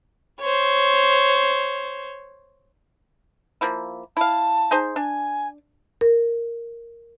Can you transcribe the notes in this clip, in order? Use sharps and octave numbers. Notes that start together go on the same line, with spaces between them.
C5 C#5
F3 A#3 E4
E4 F5 A5
D#4 G#4 C5
D4 G#5
A#4